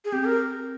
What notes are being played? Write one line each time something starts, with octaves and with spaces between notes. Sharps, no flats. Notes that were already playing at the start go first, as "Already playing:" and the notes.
G#4
C4 G4
A#4